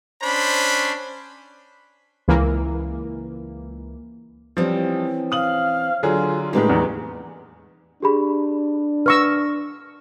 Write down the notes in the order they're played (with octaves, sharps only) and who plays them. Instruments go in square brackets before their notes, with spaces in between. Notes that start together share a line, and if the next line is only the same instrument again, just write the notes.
[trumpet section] C#4 D4 C5 B5
[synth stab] C#2 E3 A#3
[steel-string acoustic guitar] E3 C4 C#4 [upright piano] F3 G3
[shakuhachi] F5 [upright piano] D#6 F#7
[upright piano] D3 F#3 G#4 [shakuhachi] F4
[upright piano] A2 G#3 A#3 [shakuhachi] D#4 [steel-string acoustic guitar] G4 B4 D5
[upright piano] E2 E3
[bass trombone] D4 [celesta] G4 G#4 B5
[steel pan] B4 C#6 E6 [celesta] F6 A#6